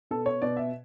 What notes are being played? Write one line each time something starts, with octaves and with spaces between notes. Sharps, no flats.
B2 A4
C#5
B2 D5
E5